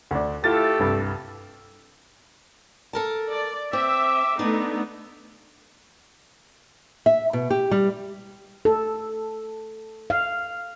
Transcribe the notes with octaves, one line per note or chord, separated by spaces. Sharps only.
D2 D4
A3 E4 F4 G4 A4 A6
C2 G2
A4 A#4 A5
D5
C4 E5 D6
A3 B3 D4 D#4
E5
B2
G4
G3
A4
F5